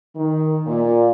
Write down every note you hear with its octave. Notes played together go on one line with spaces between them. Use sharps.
D#3
A#2